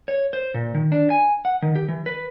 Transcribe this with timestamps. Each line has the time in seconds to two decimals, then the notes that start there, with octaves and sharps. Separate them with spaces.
0.08 C#5
0.33 C5
0.54 A#2
0.75 D#3
0.92 D4
1.10 G#5
1.45 F#5
1.62 D#3
1.76 G4
1.88 E3
2.06 B4